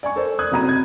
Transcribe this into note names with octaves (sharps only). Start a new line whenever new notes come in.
D5 G#5 C#6
A4 A#4 C5 D5
D#6 F#6 G#6
F#1 C3 F#4 A#5 B5 D#7
C3 G#6